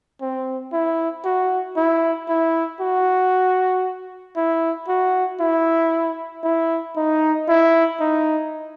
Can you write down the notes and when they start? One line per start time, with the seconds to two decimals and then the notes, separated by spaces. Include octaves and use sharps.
0.21 C4
0.73 E4
1.25 F#4
1.77 E4
2.29 E4
2.81 F#4
4.37 E4
4.88 F#4
5.40 E4
6.44 E4
6.96 D#4
7.48 E4
8.00 D#4